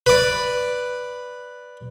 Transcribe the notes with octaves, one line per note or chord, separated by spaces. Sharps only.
B4 D5